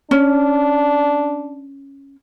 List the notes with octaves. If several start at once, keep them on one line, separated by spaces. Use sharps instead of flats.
C#4 D4